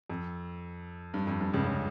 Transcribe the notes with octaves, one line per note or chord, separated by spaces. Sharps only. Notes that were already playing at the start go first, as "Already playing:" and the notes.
F2
G2
F2
G2
C#2 C#3
C#3